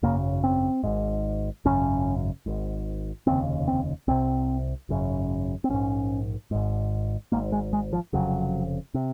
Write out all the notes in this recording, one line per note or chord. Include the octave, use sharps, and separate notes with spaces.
G#1 F#2 C#3 A#3
C4
G#1 G#2
G#1 F#2 C#3 C#4
G#1 G#2
F1 D#2 C#3 C4
C4
C2 C3 C4
G#1 F#2 C#3
C4
A#1 G#2 C#4
G#1 G#2
G#1 G#2 A#3
G#3
G#3
F3
F1 F2 C#3 F#3
C3